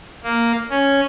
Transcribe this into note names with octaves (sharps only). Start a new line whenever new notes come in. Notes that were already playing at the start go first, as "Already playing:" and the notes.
A#3
C#4